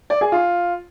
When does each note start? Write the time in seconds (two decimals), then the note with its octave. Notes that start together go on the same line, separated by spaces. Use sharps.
0.10 D5
0.21 G#4
0.32 F4